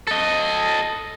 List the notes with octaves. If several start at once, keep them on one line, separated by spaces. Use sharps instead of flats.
A4 D#5